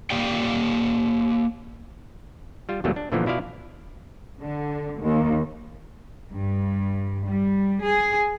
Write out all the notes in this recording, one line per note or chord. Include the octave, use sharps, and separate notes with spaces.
A#3 G4 D5 F5 G5
G3 F4
E2 B2 F#3 G3 A3 A#3
D4
A#2 D3 E3 F3 A#3 B3
B2 E4 F4 D5 F5
D3
D#2
G2
G3
G#4